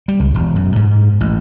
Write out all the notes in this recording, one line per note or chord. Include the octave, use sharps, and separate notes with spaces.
G3
C#2
E1
F#2
G#2
A1